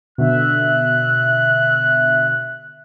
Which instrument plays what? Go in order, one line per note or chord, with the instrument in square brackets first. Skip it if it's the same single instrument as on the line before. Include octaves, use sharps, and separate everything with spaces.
[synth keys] B2 D3 [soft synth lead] E5 [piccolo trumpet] F#6